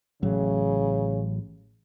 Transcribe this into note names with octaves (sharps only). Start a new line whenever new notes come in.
A1 C#3 F#3